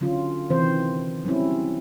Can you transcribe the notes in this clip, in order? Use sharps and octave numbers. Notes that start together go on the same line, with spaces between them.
D3 F#3 C#4 F4
C3 D#3 E3 C4 C5
F#3 G3 C4 C#4 E4